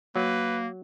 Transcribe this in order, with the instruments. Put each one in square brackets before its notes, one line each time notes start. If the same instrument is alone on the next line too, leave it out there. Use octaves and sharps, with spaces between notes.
[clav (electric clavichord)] F#3 [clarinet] A#3 [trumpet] B4